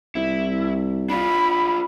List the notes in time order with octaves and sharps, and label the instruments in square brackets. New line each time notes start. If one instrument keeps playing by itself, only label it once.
[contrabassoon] C2 [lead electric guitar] E4
[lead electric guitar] D4 F4 [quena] B5